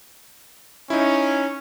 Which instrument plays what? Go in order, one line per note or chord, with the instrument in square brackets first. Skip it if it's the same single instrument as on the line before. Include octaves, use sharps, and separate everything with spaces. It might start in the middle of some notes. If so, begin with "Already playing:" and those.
[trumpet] C#4 [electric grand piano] D#4 E4